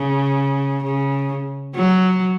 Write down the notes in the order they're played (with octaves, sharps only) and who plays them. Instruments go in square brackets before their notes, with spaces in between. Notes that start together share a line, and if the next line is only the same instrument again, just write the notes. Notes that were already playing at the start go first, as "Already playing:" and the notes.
Already playing: [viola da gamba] C#3
C#3
F#3